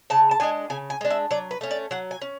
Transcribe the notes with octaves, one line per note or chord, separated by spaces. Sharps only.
C#3 A5
A5
G#3 D4 G#5
C#3 G#5
G#5
G#3 D4
E5
F#3 D5
B4
A3 C#4
D5
F#3 F#5
G#5
C#4